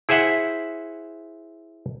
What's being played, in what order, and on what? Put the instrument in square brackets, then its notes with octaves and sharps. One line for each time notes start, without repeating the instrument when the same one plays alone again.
[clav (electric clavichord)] E4 G#4 C5 E5 F#5